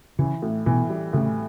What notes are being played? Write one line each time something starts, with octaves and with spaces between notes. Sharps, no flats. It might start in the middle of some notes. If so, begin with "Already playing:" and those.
C#3 E3
A2
B2 E3
G3
A2 C#3